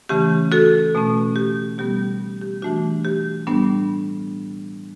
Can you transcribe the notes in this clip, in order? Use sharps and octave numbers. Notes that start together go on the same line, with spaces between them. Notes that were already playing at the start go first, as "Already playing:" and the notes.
C#3 E3 A3 C#4 G4
F#4 A4
B2 A3 C#4
G4
B2 G3 B3 G4
G4
E3 A3 D4 F#4
G4
A2 G3 B3 D4